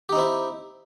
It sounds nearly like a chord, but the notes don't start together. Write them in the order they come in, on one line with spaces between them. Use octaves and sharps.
G4 D#4 C4 E4